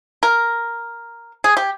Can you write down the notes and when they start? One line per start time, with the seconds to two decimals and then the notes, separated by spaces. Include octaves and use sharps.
0.23 A#4
1.44 G#4
1.57 G4